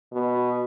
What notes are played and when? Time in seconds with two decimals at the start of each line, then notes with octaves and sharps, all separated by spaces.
0.13 B2